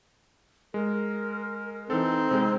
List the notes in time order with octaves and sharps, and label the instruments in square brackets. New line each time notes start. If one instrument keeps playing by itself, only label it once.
[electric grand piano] G#3 [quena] A#4
[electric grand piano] E3 A4 [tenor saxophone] C4 [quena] D#4
[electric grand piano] C3 G#3